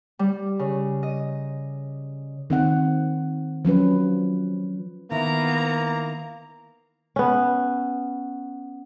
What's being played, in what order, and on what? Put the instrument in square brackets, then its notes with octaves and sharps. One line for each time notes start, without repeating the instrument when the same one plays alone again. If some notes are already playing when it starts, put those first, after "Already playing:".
[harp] G3
C#3
D#5
[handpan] D#3 C4 F#5
F3 F#3 C#4 B4
[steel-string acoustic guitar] D#3 E4 [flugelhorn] A#3 [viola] B3 A#5
[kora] B3 C#4